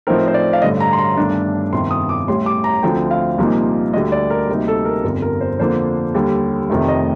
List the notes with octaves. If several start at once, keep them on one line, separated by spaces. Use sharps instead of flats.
A2 F3 A3 C4 D#4 A#4
C5
D5
F5
A1 G2 D3 D#5
A#5
C6
A#5
G1 G2 D#3 A3 D4
G1 F2 C3 D#3 C6
D#6
D6
A1 A2 G3 C6
D6
A#5
D2 D3 F3 A3 C4 G5
F5
C2 A#2 F3 A#3 D#4
D2 D3 G3 D#5
D5
A#4
D2 C3 G3 A#3 D#4
A4
A#4
G1 F2 D3 A#4
A#4
C5
F2 D3 F3 A#3 D4 C5
D#2 D3 G3
F1 F2 C3 D#3 A3
D#5